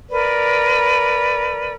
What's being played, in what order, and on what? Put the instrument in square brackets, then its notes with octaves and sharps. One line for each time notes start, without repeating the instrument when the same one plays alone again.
[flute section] A#4 B4 D5